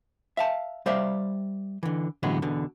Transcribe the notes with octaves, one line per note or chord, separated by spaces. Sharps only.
E5 F5 A5
G3 C5 D5 E5 F5
D3 E3
A2 D3 E3 F#3 G#3 B3
E2 B2 D3